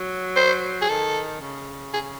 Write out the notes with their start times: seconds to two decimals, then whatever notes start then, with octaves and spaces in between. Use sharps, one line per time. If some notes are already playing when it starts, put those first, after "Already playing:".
Already playing: F#3
0.36 C5
0.81 G#4
0.88 D#3 A4
1.41 C#3
1.93 G#4